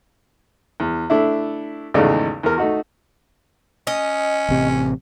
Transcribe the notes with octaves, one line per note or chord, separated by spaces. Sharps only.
E2
A3 D4 E4
G#1 E2 C#3 A3 D#4 D5
E2 A#4
A3 D#4 F#4
C#4 D#5
A1 C3